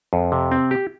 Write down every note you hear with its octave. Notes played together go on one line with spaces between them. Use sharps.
F2
C3
C4
G4